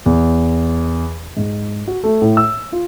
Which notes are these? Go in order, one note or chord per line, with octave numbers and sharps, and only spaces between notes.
E2
G#2
F#4
A3
A2
E6
F4